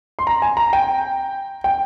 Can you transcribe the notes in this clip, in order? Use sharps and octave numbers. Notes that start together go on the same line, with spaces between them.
C6
A#5
G#5
A#5
G5
G5